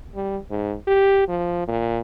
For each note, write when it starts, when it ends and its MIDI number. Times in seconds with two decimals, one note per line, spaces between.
0.15 0.37 55
0.51 0.74 44
0.88 1.26 67
1.28 1.64 53
1.68 1.99 46